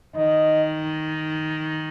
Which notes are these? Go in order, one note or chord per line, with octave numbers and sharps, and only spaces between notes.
D#3 D#5